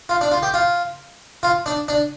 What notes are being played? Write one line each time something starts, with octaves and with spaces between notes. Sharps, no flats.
F4
D4
F4
G4
F4
F4
D4
D4